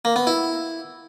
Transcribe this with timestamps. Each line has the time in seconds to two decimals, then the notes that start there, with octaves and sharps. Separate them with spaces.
0.05 A#3
0.16 B3
0.27 E4